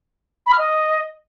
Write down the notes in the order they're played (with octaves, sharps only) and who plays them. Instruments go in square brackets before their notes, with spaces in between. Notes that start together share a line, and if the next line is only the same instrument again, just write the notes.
[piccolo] B5
F6
D#5